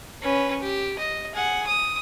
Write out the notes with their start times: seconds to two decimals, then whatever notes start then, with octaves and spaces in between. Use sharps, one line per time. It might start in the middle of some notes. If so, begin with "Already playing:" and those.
0.22 C#4 B4
0.61 G4
0.98 D#5
1.35 G#4 F#5
1.67 D#6